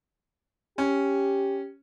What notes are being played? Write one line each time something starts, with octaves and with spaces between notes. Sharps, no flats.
C#4 G4